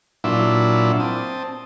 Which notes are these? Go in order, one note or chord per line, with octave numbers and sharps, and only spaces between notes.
A#2 F#3 D4 E4 F4 E5
C4 A5 D#6